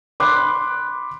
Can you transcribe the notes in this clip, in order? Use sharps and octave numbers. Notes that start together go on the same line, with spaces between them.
B5 C6 D6 F#6